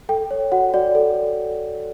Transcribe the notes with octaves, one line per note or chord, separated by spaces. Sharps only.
A4 G5
C#5
F#4 F#5
F#4 D5
A4